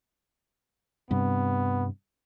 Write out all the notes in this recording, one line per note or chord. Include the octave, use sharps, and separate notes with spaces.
G2 C3 B3